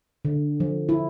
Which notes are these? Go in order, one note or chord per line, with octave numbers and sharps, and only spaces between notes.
D3
F3
E4